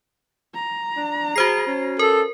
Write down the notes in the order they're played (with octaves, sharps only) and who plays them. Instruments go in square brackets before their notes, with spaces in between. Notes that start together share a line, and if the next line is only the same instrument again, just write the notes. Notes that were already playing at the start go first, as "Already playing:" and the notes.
[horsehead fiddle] A#5
[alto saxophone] D4
[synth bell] F#4 C5 C7 [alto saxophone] G#4
[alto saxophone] C#4
[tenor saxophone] A4 [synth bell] A#4